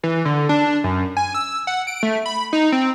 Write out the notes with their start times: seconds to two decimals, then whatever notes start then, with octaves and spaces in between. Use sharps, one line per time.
0.03 E3
0.25 D3
0.49 D4
0.84 F#2
1.17 G#5
1.34 E6
1.67 F#5
1.87 D7
2.03 A3
2.26 B5
2.53 D#4
2.72 C4